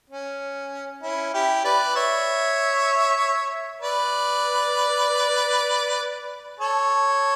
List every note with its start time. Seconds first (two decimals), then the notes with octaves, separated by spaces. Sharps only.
0.10 C#4
1.03 C#4 E4
1.34 E4 G4
1.64 B4 D5
1.96 C#5 E5
3.81 B4 D5
6.60 A4 C#5